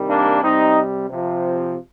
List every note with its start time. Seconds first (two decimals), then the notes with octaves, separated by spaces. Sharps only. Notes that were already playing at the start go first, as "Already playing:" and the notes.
Already playing: C3 D#3 G3
0.09 A#3 D4
0.43 C3 G3 C4 D#4
1.10 C3 F3